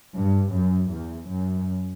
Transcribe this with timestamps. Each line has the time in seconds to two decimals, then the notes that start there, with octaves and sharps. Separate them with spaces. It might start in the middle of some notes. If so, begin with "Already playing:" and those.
0.18 G2
0.54 F#2
0.92 E2
1.29 F#2